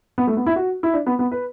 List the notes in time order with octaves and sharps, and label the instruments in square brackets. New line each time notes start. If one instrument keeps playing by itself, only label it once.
[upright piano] B3
A3
B3
E4
F#4
E4
D4
B3
B3
B4